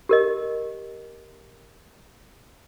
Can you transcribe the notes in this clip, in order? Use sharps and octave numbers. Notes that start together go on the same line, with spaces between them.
G4 A#4 D#5